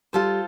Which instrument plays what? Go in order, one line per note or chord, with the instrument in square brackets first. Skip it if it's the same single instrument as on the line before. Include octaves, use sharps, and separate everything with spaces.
[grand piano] G3 [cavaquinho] F4 A4 C5